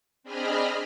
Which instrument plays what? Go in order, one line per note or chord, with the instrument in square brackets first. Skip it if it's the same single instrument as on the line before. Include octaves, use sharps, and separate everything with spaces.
[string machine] C4 D4 G#4 D#5 B5 F6